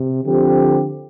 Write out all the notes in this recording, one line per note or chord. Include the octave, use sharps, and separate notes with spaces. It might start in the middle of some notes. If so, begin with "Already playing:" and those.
Already playing: C3
D3 F3 C4 G4